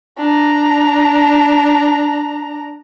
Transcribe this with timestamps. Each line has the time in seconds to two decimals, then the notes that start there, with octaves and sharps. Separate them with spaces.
0.18 D4 A#5